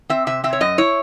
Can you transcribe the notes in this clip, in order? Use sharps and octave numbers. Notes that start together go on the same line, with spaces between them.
C4 E5
C3 E5
C4 E5
C#5
F#2 D#5
E4 C#5